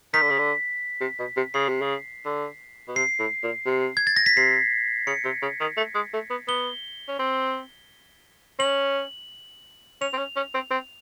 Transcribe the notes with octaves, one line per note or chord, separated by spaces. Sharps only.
D#3 B6
D3
C#3
D3
C3
B2
C3
C#3 C7
C3
C#3
D3
B2
C3 C7
A2
A#2
C3
G#6
A6
A#6
B6
C3 C7
C#3 C#7
C3
C#3
D#3
A3
G#3
A3
B3
B3 G7
C#4
C4
C#4 F#7
C#4 F7
C4
C#4
C#4
C4
C4